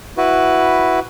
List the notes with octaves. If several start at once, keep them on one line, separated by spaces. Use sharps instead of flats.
E4 F#4 B4